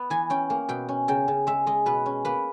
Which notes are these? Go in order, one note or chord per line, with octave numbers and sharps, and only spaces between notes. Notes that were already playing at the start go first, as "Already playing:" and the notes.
Already playing: B3
E3 G#5
C#4 G5
A#3
B2 G5
C#4
C#3 G5
C#3
G#3 E5
G#3 D#5
B2 B4
C#4
A#3 B4